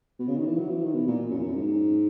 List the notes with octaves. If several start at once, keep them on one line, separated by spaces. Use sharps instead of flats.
B2
C#3
D#3
E3
F#3
E3
D#3
B2
A#2
F#2
E2
F#2
G#2